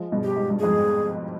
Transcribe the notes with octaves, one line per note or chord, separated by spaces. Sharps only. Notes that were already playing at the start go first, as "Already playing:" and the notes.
Already playing: F3 G#3
G2 B2
G4
G#2
G2
F2 G#2 G#4